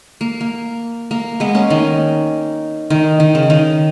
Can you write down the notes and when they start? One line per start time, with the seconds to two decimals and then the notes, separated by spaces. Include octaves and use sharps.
0.21 A#3
0.41 A#3
1.11 A#3
1.40 G#3 B3
1.55 A#3 C#4
1.70 D#3
2.90 D#3
3.20 D#3
3.35 C#3
3.50 D#3